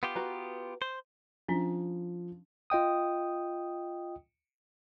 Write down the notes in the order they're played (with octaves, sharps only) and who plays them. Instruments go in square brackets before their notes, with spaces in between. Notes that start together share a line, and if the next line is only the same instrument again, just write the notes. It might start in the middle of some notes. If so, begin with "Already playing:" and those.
[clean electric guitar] B3 F4 G4
[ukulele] F#4 B4 A#5
[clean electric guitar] C5
[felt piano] F3 [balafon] C#4 D4
[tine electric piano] F4 D#5 G5 D#6